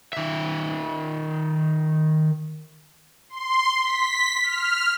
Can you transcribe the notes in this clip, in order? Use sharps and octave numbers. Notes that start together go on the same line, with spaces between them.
D#3 E5
C6
B6
F6